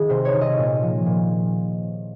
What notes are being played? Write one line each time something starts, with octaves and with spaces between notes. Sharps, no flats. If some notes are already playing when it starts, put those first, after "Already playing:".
Already playing: D#3 G#4
C3 C5
C#5
D#3
D#5
A#2
F3
A#2